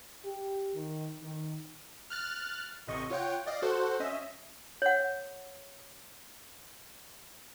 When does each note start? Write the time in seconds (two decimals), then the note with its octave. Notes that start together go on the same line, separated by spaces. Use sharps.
0.25 G4
0.75 D#3
1.23 D#3
2.10 F6 F#6 A6
2.88 A1 C3 D#5 C#6
3.10 F4 C#5 F#5 G5
3.46 D5 D#5 F5
3.62 F#4 A4 C5 F#5
4.00 C#4 D#5 E5
4.82 C#5 F#5